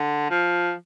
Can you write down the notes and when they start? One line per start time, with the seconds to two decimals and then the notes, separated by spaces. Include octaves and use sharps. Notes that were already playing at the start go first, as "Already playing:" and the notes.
Already playing: D3
0.30 F3